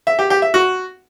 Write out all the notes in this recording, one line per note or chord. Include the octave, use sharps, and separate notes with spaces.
E5
G4
G4
E5
F#4